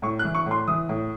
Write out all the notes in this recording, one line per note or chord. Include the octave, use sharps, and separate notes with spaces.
A2 C#6
F#6
E3
C#6
A2
C6
E3 D#6
A2